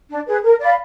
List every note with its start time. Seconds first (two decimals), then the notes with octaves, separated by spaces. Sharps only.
0.09 D4
0.27 G#4 B4
0.44 A#4
0.60 D5 F5 B5